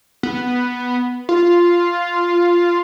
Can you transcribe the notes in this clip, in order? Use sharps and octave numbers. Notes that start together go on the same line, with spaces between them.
B3
F4